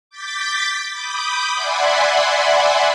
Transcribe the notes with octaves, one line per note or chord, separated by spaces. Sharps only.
D6 G6 A6 B6
B5 D6 D#6 G6
D5 E5 F#5 G#5 B5 C6